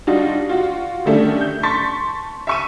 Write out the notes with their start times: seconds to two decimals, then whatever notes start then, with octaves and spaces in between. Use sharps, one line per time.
0.07 G3 D4 D#4 F4 F#4
0.49 F4 F#4
1.06 D#3 G3 A3 C#4 D4
1.41 G6
1.63 A5 C6 C#6 A6 B6
2.47 E5 C#6 D#7